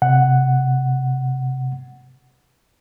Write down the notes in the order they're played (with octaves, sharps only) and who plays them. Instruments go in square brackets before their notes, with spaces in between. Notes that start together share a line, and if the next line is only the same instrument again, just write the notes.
[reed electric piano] C3 F#5